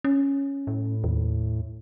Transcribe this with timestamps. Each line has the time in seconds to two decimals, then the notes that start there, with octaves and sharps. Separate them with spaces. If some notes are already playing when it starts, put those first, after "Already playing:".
0.04 C#4
0.67 A2
1.04 D#2